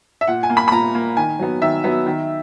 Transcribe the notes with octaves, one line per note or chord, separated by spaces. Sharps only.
E5
A#2 F#5
G#5
A#3
B5
B5
A#2 A#5
A#3
D#3 G#5
F#3 B3
D#3 E5
F#3 B3
D#3